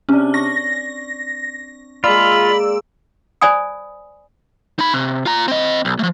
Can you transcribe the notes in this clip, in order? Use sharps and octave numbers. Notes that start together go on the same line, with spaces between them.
C3 C#4 D4
C#6 A#6
G#3 A#3 F4 D5 B5 E6
C5 D5 G#5 B5 D#6
D#4 B5
C3
F4 A#5
C4 D#5
B1
F3 A3